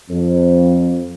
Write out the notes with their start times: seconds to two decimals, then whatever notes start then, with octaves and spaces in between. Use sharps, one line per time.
0.10 F2